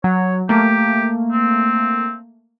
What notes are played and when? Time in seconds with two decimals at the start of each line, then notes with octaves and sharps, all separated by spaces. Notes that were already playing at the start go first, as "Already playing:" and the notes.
0.04 F#3 C#5
0.49 A3 A#3 G4
1.32 C4